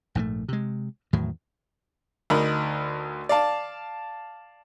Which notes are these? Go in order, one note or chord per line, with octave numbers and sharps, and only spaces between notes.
A#1 G#2 F3 A3
C3 G#3
E2 A2 D#3 F#3
D2 D#4 A#4 B5
D5 F5 A5